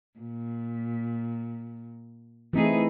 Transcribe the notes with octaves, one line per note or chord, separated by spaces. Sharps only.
A#2
E3 A3 C4 D#4 E4 G#4